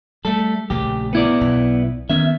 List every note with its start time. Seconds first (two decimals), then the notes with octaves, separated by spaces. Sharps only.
0.25 G3 A3 A4
0.70 A#1 C#3 A3 G4
1.13 B3 E4 D5
1.41 B1
2.09 D#3 B3 C#4 E5